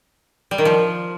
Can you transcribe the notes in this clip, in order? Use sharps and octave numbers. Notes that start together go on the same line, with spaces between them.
G3
D#3
F3